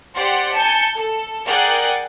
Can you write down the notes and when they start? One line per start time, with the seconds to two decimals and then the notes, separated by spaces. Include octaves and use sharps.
0.15 G4 C5 D5 F#5 C6
0.55 G#5 A5 G6 C#7
0.95 A4
1.47 G#4 A#4 D5 F#5 G5 F#6